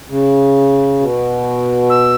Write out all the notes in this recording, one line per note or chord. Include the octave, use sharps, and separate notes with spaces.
C#3
B2
E6